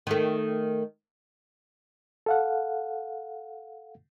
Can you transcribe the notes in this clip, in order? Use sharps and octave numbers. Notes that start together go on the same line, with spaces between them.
D#3 A3
A4 F5 F#5